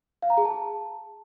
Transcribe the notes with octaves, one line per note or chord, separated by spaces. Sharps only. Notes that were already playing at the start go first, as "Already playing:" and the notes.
F5
A#5
G#4
A5